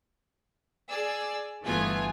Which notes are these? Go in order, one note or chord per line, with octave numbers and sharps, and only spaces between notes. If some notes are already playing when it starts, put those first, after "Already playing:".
G#4 D5 E6
G1 E3 A3 B3 F4 G#5